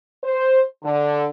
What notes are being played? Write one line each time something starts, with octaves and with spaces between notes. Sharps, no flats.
C5
D3